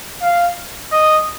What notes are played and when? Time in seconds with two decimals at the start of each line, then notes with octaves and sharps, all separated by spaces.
0.22 F5
0.92 D#5